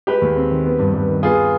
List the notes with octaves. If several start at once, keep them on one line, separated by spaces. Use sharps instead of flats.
G#3 G4 B4
D#2
C4
D#3
B3
G2
G2
D#3
B3 F4 G#4